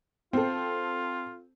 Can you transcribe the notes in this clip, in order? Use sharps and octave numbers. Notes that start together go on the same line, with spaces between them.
C4 F4 A4